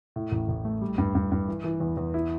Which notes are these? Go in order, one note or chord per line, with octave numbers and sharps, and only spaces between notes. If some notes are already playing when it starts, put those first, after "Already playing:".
A2
A1
A1
A3
G3
G2
G2
G2
E3
E3
E2
E2
E4